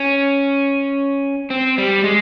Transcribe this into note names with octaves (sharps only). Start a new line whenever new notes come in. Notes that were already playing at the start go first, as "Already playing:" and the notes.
Already playing: C#4
C4
G3
G#3